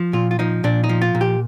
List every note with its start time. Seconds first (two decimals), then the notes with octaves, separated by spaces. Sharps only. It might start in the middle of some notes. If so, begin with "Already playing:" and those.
Already playing: F3
0.13 A#2 F4
0.31 F4
0.39 F3 D#4
0.64 A#2 D4
0.84 D#4
0.89 F3
1.02 F4
1.15 A#2
1.21 G4